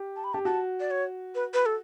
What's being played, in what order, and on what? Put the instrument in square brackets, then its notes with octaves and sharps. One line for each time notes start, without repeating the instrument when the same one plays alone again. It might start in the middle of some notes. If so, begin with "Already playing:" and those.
Already playing: [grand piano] G4
[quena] A5
B5
[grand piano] G4 [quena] A5
[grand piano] F#4 [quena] A5
[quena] D5
C#5
B4
B4
A4